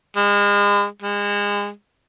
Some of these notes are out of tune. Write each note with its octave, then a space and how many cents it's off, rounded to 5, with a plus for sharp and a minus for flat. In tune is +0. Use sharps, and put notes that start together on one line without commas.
G#3 -35
G#3 -30